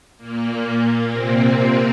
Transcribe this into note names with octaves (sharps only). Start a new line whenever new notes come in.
A#2 A#3
C3 C4
C3 C4